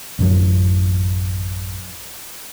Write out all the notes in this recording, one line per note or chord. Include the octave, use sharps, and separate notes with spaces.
A1 F#2 F#3